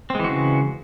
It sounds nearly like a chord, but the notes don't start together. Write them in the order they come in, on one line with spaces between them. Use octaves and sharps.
C4 G#3 E3 F#4 C#3